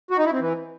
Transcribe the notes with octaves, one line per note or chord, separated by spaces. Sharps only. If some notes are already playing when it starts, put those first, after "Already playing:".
F#4
D#4
E4
C4
E3